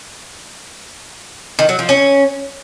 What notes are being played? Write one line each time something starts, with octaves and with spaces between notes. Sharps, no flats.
D#3
F#3
F3
C#4